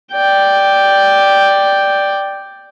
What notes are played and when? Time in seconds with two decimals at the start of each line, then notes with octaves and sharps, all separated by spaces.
0.13 D5 G5